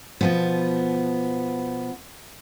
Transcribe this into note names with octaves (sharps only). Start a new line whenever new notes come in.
B2 F3 B3